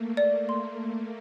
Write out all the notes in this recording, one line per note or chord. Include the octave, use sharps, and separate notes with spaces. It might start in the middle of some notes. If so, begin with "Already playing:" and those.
Already playing: A3 A#3
D5
C6